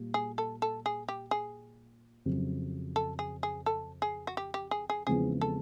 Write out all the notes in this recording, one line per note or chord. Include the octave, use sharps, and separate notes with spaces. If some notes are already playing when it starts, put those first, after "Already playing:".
Already playing: A#2 G3
G#4
A4
A4
G#4
G4
G#4
F2 C#3 F#3
A4
G#4
G#4
A4
G#4
F#4
G4
G4
G#4
G#4
E2 C#3 F3 G#3 C4 G#4
A4